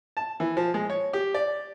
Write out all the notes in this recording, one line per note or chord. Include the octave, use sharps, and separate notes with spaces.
A5
E3
F3
G#3
C#5
G4
D5